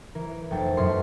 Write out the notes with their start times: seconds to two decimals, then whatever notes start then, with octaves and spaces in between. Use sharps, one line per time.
0.15 E3 A#4
0.51 F1 A3 G5 A6
0.77 F#2 B2 C6